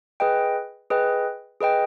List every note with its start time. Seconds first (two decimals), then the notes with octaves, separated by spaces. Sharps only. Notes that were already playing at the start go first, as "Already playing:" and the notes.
0.20 G#4 B4 D#5 G5
0.90 G#4 B4 D#5 G5
1.60 G#4 B4 D#5 G5